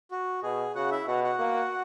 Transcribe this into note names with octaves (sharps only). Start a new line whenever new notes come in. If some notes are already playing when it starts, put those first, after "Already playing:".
F#4
B2 G#4
C#3 F#4 F#5
E4 E5
B2 F#4 F#5
F#4 F#5
A#3